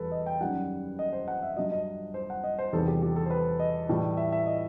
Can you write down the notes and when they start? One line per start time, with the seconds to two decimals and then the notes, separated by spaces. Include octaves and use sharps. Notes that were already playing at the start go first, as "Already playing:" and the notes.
Already playing: E2 G3 A4 B4
0.11 D#5
0.26 G5
0.41 F#2 D#3 G3 F#5
0.99 D#5
1.13 C5
1.28 F#5
1.43 E5
1.57 G2 F#3 D#5
1.72 D#5
2.14 C5
2.30 F#5
2.44 D#5
2.59 C5
2.72 E2 C3 D#3 G3 A4
2.88 G4
3.02 G4
3.16 A4
3.26 C5
3.31 B4
3.60 D#5
3.89 A2 E3 G3
4.17 E5
4.32 E5
4.46 D#5